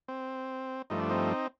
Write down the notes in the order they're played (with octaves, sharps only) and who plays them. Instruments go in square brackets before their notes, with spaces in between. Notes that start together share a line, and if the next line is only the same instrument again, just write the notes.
[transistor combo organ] C4
G2 F3 A3 D#4
D4
C4 D#4